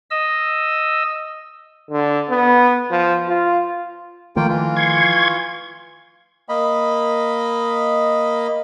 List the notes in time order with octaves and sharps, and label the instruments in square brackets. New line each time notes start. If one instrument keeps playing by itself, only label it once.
[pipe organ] D#5 E6
[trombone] D3
B3
F3
F4
[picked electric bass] D#3 F3 A3 [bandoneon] A#3 F4 G5
[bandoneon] E3 F4
[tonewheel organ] C6 C#6 G#6
[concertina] A#3 D#5 B5